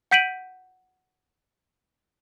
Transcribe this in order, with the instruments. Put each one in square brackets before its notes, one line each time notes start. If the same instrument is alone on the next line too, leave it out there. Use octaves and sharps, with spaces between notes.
[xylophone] F#5 G6 B6 D7 D#7 F#7